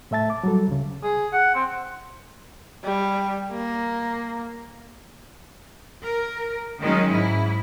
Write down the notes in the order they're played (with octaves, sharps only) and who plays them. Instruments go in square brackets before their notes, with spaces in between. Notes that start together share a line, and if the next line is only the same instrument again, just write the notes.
[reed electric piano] A2 A3 E5 A5 A6
D6
F#3 G3 A4
D2 C#3
[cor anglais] G#4
F#5
C4
[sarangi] G3
A#3
[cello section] A#4
D#3 F#3 G#3 C#4 D#4
G#2 E4